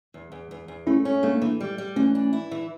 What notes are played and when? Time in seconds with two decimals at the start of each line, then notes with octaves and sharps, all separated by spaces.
0.14 E2
0.32 E2
0.51 E2
0.68 E2
0.87 A3 C#4 E4
1.05 C#4
1.23 A3 A#3 D4
1.42 E3
1.60 G3
1.78 G3
1.96 E3 A3 C#4
2.15 D4
2.33 E4
2.51 E3